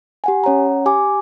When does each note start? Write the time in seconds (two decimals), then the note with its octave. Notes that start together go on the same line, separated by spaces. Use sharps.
0.24 G4 F#5 G#5
0.44 C#4 C#5 F#5 A#5
0.86 G4 G#5 D6